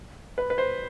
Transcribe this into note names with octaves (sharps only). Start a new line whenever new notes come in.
B4
B4
C5